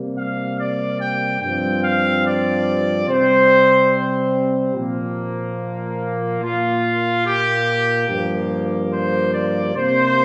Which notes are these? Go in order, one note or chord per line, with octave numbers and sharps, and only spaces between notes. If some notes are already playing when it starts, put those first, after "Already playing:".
Already playing: C3 G3 A#3
F5
D5
G5
G2 F3 C4 G5
F5
D5
C3 G3 C4 C5
A#2 F3 A#3
A#2 A#3 F4
G4
G2 F3 A#3
C5
D5
C3 A#3 C5